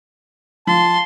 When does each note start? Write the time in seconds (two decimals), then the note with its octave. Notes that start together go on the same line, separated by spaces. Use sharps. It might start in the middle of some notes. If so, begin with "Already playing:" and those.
0.67 F3 A5 C6